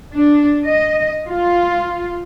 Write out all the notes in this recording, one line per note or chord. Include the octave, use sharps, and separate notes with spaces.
D4
D#5
F4